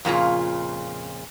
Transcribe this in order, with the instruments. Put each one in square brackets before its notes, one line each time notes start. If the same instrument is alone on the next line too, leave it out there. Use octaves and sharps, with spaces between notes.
[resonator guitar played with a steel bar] F2 A#2 C#3 F4